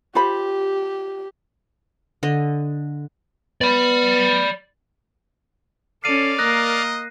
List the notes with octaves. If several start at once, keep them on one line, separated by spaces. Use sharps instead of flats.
F4 G4 C5 B5
D3 D#5
B3 D5 B5
C#4 A4 D5 F5 C7 D#7
A#3 A#4 D#5 F#6 A#6